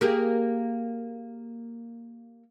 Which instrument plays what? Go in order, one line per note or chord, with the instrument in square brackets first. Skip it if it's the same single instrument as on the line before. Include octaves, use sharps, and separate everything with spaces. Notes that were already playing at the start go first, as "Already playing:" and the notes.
[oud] A#3 G4 G#4